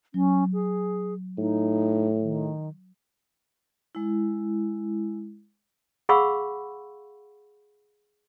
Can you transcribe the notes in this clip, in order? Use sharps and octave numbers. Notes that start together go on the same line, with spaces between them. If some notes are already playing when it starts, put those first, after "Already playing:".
F#3 C#4
G#4
A2 D#4
D#3
G#3 E4
G#4 F5 F#5 B5 C#6 E6